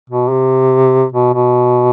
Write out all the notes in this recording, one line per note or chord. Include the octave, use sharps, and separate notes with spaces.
B2
C3
B2
B2